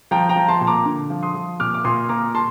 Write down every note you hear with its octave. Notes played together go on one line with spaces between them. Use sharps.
F3 G5 A#5
G5 A#5
F3
A5 C6
A#2
A#5 D6
D3
F3
C6 D#6
F3
A#2 D6 F6
D6
A#2 C6 D#6
A#2 A#5 D6
A5 C6